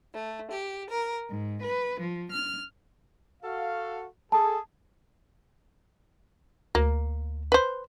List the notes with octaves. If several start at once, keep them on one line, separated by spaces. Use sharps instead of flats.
A3
G4
A#4
G#2
B4
F3
F6
F#4 A4 F5
G#4 A4 A5
D2 A#3
B4 C5